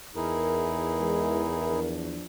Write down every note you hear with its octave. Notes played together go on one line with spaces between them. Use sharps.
E2 D#4 E4 G#4 A#4
E3 G#3
F3 D4